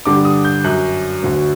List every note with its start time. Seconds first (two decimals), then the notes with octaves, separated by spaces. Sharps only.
0.05 G2 D3 G3 D6
0.25 D#6
0.45 G6
0.64 F#2 F#3 F#6
1.23 D2 D3 F#3